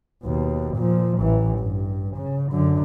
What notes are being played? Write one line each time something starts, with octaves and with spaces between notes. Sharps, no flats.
D#2 B2
A#2 F3
A1 E3
G2
C#3
F#2 D3